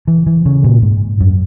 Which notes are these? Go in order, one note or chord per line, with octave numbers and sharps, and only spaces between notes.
E3
E3
C#3
A#2
G#2
F#2